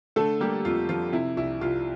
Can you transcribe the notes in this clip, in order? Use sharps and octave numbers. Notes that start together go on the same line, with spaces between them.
D3 A3 A4
G3 A#3 G4
F2 F4
F3 F4
C3 E4
C2 E4
C2 F4